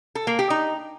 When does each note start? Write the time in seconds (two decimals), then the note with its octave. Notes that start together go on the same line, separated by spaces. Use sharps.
0.15 A4
0.27 A#3
0.39 G4
0.50 D#4